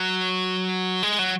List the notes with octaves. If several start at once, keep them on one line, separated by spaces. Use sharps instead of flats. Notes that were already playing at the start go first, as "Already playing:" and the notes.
Already playing: F#3
G#3
F#3